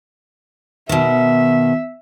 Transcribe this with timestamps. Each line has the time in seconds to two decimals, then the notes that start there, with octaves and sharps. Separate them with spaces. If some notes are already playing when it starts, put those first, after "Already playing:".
0.89 B2 D#3 E5